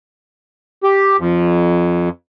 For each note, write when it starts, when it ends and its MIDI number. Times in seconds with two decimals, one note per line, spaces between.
0.83 1.17 67
1.18 2.09 41